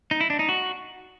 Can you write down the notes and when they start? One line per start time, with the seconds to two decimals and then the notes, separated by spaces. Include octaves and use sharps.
0.11 D#4
0.21 E4
0.30 D4
0.39 D#4
0.49 F#4